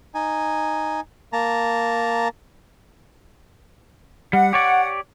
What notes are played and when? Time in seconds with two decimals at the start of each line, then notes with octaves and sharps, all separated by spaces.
0.15 D#4 G#5
1.33 A#3 A5 A#5
4.33 G3 F#5
4.53 G4 C#5 D5